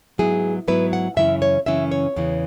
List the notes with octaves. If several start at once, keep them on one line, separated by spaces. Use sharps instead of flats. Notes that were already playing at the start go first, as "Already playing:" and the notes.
G#2 F#3 B3 E4 G#4
G#2 F#3 B3 E4 B4
F#5
F#2 C#3 E3 C#4 E4 E5
C#5
F#2 C#3 E3 C#4 E4 E5
C#5
E2 C#3 E3